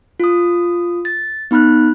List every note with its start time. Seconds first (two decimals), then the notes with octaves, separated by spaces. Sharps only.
0.20 F4 D#6
1.05 A6
1.51 B3 D#4 B5 F6 F#6